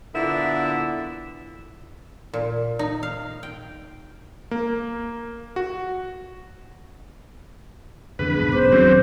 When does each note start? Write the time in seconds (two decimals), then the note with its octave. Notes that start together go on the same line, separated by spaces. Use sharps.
0.14 A#2 D3 B3 E4 E5
2.34 A#2
2.79 D#4
3.03 F5
3.43 G5
4.51 A#3
5.56 F#4
8.19 F2 D3 E3 B3 D4 G#4 B4
8.37 G#2 B2 D3
8.52 F#1 B1 C#4 C5 D6
8.72 D#1 F#3 C4